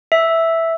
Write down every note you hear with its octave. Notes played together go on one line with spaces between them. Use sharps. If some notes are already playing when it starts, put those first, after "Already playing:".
E5